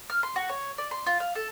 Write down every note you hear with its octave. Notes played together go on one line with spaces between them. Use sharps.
F6
C6
F#4
C#5
D5
C6
F4
F5
A4